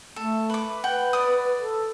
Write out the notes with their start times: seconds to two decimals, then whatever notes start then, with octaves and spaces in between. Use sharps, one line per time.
0.16 A3 A4
0.50 B4 D6
0.84 B4 F#5 G5
1.13 D5 D#6
1.59 A4